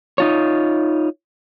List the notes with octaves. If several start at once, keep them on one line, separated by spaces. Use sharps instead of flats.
D#4 F4 C#5